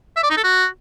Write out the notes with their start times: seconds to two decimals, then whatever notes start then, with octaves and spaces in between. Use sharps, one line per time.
0.17 E5
0.24 D5
0.30 D#4
0.37 A4
0.44 F#4